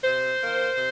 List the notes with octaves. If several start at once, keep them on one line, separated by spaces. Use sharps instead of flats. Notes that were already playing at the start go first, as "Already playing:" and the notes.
C3 C5
D#3 A#3
C3